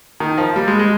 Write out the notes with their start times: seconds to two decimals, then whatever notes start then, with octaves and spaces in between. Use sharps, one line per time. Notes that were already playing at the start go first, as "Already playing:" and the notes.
0.20 D#3
0.38 F3
0.56 G3
0.68 G#3
0.79 G#3